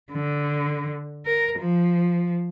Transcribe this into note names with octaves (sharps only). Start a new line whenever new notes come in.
D3
A#4
F3